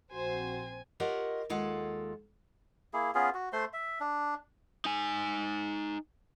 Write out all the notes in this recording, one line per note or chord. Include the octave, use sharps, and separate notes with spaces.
A#1 C4 F#4 C5 G#5
F4 G4 A#4 C#5 D#5 F#5
D#2 G#3 F4 A4 F#5
A#3 E4 G#4
B3 C#4 F4 G#4
F#4
A3 C5 C6
E5
D4
D#4 G#5